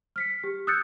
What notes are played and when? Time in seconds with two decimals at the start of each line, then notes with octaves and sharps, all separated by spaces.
0.16 F6 B6 C#7
0.44 G4
0.67 D#6 E6 F#6 G6 A6 C#7